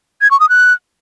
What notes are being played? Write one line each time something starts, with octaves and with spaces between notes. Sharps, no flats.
G#6
C#6
D#6
F#6